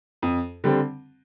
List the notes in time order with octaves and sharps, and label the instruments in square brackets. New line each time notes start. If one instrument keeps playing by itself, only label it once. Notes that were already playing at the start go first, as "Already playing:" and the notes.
[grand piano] F2
D3 G3 C4